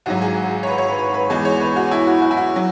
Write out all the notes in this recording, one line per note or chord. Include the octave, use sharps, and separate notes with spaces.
G#1 G#2 F#3 F#4
G#4
C#5
B4
C#5
B4
B4
B4
E2 E3 G#3 G#4
C#5
B4
F#4
E4
F#4
F#4
E4
F#4
F#3